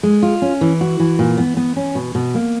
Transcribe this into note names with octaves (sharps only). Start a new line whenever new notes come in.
G#3
F4
C#4
E3
F#4
E3
A#2
B3
B3
C#4
B2
B2
A#3